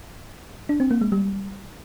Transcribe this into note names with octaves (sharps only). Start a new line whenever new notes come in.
D4
C4
A#3
G#3
G3